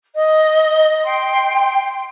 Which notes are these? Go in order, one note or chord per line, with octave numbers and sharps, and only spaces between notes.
D#5
G5 C6